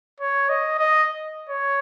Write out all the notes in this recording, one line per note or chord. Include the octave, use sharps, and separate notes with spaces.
C#5
D#5
D#5
C#5